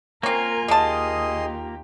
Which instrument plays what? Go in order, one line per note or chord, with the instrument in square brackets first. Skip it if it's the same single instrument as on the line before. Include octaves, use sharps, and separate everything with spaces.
[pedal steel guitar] A#3 F4 [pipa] C4 C#4 [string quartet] A#4 G#5
[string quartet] D#2 G4 [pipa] G#3 A5 [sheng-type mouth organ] G#4 D#5 C6